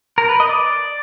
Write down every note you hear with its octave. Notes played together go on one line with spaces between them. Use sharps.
A#4
B4
D#5
D5